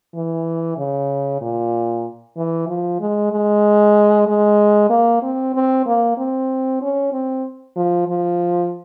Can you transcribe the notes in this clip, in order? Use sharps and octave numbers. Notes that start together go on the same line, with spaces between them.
E3
C#3
A#2
E3
F3
G#3
G#3
G#3
A#3
C4
C4
A#3
C4
C#4
C4
F3
F3